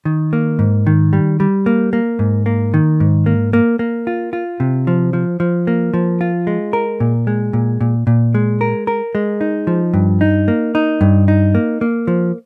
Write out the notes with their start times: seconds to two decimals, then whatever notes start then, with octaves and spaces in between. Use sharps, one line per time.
0.05 D#3
0.33 A#3
0.59 G#2
0.87 D#3
1.13 G3
1.40 G3
1.66 A#3
1.93 A#3
2.19 G#2
2.46 A#3
2.74 D#3
3.00 G#2
3.26 A#3
3.53 A#3
3.79 A#3
4.07 F4
4.33 F4
4.60 C3
4.87 F3
5.13 F3
5.40 F3
5.67 A#3
5.94 F3
6.21 F4
6.47 G#3
6.73 A#4
7.00 A#2
7.27 G#3
7.53 A#2
7.81 A#2
8.07 A#2
8.35 G#3
8.61 A#4
8.87 A#4
9.15 G#3
9.41 D#4
9.67 F3
9.94 G2
10.21 D#4
10.48 A#3
10.75 D#4
11.01 G2
11.28 D#4
11.55 A#3
11.81 A#3
12.07 F3